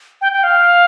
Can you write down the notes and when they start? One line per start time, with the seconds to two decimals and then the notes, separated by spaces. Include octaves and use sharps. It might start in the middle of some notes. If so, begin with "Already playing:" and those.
0.21 G5
0.32 G5
0.43 F5